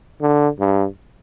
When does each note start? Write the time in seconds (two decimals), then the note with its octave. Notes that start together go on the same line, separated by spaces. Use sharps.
0.21 D3
0.60 G2